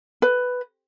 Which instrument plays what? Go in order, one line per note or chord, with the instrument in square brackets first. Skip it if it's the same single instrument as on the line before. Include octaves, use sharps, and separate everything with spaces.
[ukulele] B4